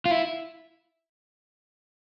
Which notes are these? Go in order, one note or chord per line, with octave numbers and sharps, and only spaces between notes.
F4
E4